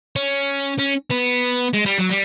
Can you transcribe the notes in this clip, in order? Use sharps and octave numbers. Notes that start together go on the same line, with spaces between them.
C#4
C#4
B3
G#3
G3
F#3
G3